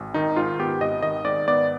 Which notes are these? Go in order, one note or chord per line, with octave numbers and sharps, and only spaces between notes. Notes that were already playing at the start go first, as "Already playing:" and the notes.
Already playing: G#1
D#3 D#4
G#2 F4
B3 G4
G#1 D#5
D#3 D#5
G#2 D5
B3 D5